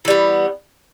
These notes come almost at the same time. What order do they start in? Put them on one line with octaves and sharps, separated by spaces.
E3 G3 B3